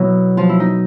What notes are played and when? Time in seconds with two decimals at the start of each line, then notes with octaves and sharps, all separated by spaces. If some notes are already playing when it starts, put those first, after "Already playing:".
Already playing: B2 F#3 B3 E4
0.37 F3 F4
0.49 E4
0.60 D#4